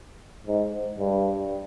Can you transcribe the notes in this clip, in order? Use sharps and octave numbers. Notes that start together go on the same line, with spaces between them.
G#2
G2